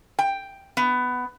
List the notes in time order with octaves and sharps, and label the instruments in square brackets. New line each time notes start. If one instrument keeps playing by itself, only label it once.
[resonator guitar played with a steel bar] G5
B3